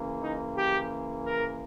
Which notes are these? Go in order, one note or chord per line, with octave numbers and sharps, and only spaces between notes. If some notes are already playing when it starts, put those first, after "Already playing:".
Already playing: C#3 E3 A#3
D#4
G4
A#4